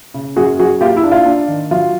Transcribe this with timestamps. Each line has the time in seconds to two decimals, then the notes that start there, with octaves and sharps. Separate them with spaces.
0.14 C#3
0.36 F#2 F#4 G#4
0.59 F#3 F#4 G#4
0.81 A#3 F4 G4
0.96 E4
1.04 D4
1.12 F4
1.26 D4
1.48 D#3
1.71 F#3 F4